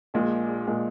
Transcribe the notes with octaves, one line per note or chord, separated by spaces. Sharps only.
A#1 A#2 G#3
A#2 G#3